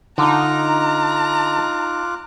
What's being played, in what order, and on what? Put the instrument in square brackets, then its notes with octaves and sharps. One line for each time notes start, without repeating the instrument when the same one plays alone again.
[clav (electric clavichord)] D3 [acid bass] D#4 [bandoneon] F4 D6 F#6 [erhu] A#5